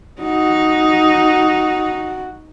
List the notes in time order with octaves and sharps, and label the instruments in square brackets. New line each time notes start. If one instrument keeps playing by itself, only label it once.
[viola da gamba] D#4 [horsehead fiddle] F#4